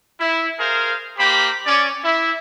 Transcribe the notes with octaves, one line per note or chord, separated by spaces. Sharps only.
E4
G#4 A#4 C5 F5
A#3 G4 C5 B5
C#4 D5
E4